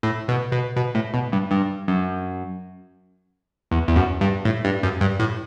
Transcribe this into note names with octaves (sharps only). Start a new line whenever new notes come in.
A2
B2
B2
B2
A2
B2
G2
G2
F#2
E2
E2
F#2
G2
A2
G2
F#2
G2
A2